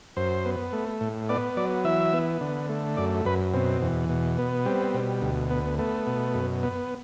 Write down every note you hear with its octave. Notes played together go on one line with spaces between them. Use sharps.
F#2 C5
B3
A3
A2
B3 D5
F#3 D5
E3 E5
B3
D3
A3
F#2 D5
F#2 B4
B2 C4
E2
B2
B3
G3 C4
B2
D2
B3
A3 B3
B2
F#2
B3